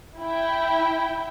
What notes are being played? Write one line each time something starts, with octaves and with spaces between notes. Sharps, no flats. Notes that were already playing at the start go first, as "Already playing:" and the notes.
E4 G5